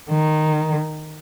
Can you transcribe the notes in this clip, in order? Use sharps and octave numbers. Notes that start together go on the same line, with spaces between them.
D#3